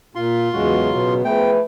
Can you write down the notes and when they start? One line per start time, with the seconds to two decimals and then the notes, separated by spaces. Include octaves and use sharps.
0.15 A#2 F4 C6
0.53 E2 A2 C#3 F#3 G#3 F#4
0.92 B2 B3
1.25 F3 A3 G#4 B4 G5